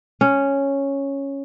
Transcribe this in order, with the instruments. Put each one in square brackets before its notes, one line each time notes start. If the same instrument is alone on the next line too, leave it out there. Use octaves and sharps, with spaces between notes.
[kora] C#4